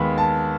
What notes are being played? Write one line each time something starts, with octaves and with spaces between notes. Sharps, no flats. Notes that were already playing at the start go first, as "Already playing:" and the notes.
Already playing: D#2 D#3 G#3 B3 B5
A5